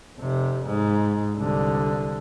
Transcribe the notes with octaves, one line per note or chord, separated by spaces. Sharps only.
F1 C3
G#2
C2 D3